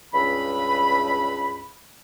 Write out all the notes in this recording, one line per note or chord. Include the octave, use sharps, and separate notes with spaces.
C#2 G2 B5